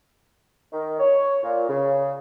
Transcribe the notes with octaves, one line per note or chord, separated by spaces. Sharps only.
D#3
C#5
A#2
C#3